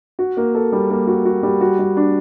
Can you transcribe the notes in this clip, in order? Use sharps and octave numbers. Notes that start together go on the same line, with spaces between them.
F#4
A#3
A4
G3
A#3
F#4
F#4
G3
F#4
G3
D4